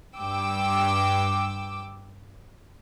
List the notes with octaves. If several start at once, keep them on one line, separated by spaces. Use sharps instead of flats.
G2 G5 D6 E6